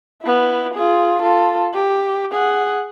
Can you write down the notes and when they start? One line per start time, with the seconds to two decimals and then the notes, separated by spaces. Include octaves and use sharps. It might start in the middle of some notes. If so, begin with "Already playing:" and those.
0.23 B3 E4
0.75 F4 G#4
1.22 F4 A4
1.74 G4
2.32 G#4 F#5